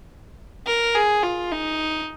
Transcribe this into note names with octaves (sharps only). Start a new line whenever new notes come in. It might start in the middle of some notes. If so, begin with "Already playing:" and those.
A#4
G#4
F4
D#4